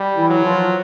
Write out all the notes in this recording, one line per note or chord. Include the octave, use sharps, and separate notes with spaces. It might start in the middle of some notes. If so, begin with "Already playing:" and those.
Already playing: G3
E3 E4
F#3
F3 F4